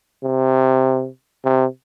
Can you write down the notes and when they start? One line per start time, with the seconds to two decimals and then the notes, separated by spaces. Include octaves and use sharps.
0.23 C3
1.45 C3